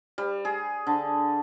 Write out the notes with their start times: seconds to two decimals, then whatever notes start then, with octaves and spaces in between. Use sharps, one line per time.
0.18 G3
0.45 G#4
0.87 D3